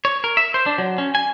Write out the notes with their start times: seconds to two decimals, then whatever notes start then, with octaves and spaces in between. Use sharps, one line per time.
0.05 C#5
0.24 A#4
0.37 E5
0.54 C5
0.66 D4
0.78 F#3
0.98 C#4
1.15 G#5